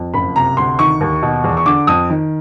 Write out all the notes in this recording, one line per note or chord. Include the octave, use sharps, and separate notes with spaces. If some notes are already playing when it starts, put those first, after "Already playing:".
Already playing: F2
F#1 B5
C3 A#5
D2 C6
D#3 C#6
D#2
B2
E2
C#6
D3 D6
F2 D#6
D#3